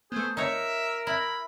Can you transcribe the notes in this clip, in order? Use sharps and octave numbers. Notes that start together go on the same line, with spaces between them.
A3 B3 G#4 C5
D#4 A#4 C#5 E5
E4 B5